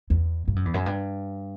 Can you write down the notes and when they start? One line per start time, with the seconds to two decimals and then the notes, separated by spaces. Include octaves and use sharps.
0.10 E2
0.48 G2
0.56 F#2
0.65 E2
0.74 F#2
0.86 G2